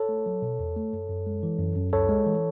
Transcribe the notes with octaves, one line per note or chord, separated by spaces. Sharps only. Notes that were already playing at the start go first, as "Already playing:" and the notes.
Already playing: A4 C#5
A3
F#3
B2
E2
A3
F#2
F#2
G#3
E3
F#2
F#2
C#2 A4 C#5
G#3
E3